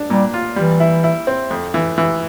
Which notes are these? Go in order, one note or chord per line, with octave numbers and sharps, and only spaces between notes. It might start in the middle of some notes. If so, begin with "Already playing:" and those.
Already playing: D4
A#2 G3
F4
E3 G3
E4
E4
C4
F2
E3
E3